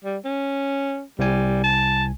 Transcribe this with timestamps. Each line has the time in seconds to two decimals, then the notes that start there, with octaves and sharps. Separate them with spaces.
0.04 G3
0.25 C#4
1.19 C2 G3 G#5
1.64 A5